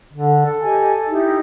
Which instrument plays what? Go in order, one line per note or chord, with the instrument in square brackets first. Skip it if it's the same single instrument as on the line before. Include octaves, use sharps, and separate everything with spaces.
[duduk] D3
A4
[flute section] G4 D#5 G#5
D#4 E4 G4